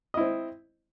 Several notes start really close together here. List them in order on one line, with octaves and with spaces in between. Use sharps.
D#5 E4 C4